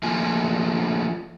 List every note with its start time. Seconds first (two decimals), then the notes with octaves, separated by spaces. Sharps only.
0.03 F3 A3 A#3 F4 G#5